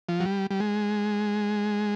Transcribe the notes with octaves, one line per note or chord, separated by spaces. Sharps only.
F3
F#3
G3
G3
G#3